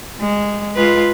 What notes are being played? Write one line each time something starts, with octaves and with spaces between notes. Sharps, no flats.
G#3
G#3 F4 B4